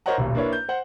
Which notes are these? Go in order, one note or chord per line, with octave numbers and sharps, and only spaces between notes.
A#4 C5 C#5 D#5 F#5 A#5
D#1 B1
A#3 D4 E4 B4 C#5
G6
C5 F#5